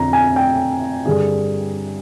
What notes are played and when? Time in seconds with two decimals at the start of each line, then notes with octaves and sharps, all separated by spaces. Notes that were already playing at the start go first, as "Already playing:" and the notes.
Already playing: F2 D3 A#5
0.13 G#5
0.36 G5
1.06 G2 D3 G#4